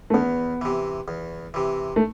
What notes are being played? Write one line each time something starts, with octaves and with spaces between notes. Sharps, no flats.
A3
E2 B3
C3 E3
E2
C3 E3
A3